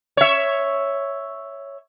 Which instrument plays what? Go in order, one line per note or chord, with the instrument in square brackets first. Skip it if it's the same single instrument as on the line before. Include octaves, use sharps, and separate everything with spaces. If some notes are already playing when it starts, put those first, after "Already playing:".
[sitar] C#5 E5